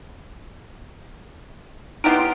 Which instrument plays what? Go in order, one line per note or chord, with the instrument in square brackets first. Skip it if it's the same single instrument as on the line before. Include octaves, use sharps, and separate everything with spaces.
[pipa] B3 G4 A#4 [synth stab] D#4 E4 C6 [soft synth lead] D7